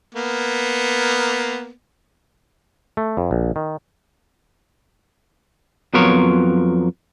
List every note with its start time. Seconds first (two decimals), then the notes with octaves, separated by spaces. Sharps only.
0.15 A#3 B3
2.97 A3
3.17 F2
3.31 A#1
3.56 D#3
5.94 F2 F#3 B3 F4 A#4 C#5